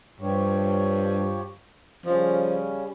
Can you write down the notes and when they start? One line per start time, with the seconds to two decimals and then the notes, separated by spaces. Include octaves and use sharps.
0.21 G2 F3 G4 C#5
2.06 C#3 F3 G3 C#4